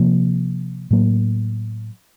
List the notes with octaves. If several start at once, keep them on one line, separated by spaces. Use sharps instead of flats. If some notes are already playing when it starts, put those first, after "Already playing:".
Already playing: C3 F3 A#3
A2 F#3 A#3